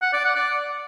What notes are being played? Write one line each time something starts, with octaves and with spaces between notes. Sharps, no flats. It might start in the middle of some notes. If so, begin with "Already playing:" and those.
F#5
D5
F#5
D5